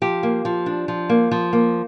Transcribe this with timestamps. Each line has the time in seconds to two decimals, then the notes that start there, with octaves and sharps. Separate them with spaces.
0.02 F3 G4
0.23 A#3
0.45 F3
0.66 D4
0.88 F3
1.10 A#3
1.31 F3
1.53 A#3